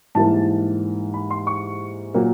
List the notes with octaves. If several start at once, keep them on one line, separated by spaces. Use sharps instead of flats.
G#2 E3 G3 A#3 A5
B5
C6
C#6
A#2 F#3 A#3